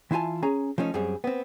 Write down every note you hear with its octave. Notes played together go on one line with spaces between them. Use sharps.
E3 E4 F4 G#5 A5
C#4 G#4 A#5
F3 A3 C#4 D#4
F#2 G3 C4 G#4
B3 C4